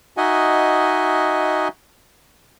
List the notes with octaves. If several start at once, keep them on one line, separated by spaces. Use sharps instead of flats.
D#4 F#4 D#5 E5 F#5 G#5